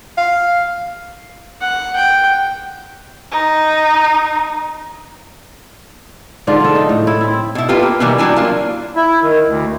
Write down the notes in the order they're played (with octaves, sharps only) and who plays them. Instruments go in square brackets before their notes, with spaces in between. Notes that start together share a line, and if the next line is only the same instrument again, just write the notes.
[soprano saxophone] F5
[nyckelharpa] F#5
G5
[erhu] D#4
[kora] G#2 D3 D4 F4
F3 A4
D#4
A2 A4
E4
C4 E4
[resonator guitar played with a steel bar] B2 E4
B3 F4 G4 A4 B4
A#3
B2 D#3 E3 G3 A#3 B3
F#3 G3 D4 E4 G#5
A#3 D4 F4
[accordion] E4
D#3
D2